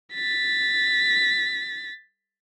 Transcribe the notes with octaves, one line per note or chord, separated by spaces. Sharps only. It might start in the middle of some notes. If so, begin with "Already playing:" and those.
A6 B6